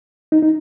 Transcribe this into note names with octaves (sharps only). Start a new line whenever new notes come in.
D#4
D#4